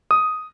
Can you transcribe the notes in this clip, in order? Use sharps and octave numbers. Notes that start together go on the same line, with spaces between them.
D#6